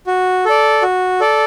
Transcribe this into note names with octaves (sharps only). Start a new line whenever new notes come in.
F#4
A4 D5
F#4
A4 D5